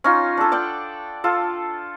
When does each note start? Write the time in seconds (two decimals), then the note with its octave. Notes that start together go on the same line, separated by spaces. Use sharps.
0.04 C#4 D#4 F4
0.37 D4 A4
0.52 D5 F#5 G5
1.24 F4 A4